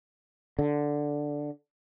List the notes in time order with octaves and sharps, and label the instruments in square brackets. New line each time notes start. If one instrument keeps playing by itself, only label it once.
[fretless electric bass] D3